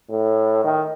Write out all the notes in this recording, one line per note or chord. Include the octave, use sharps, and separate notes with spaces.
A2
D#3